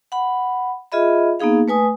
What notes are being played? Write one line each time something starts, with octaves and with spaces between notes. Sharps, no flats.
F#5 B5
F4 G#4 D#5 E5 B5
A#3 B3 D#4 G#4 F5
A3 B4 G#5 D#6